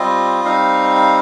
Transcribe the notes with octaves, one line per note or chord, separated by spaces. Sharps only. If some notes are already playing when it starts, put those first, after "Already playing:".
Already playing: G3 C4 F4 D#5
G3 C4 D#4 F5
F5